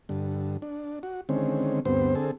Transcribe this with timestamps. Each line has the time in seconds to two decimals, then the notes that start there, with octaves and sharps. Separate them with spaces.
0.09 G2 D3
0.62 D4
1.03 F#4
1.29 D3 D#3 G#3 C4 C#4
1.85 D2 G2 B3 C4 C5
2.15 D3 C4 G#4 A4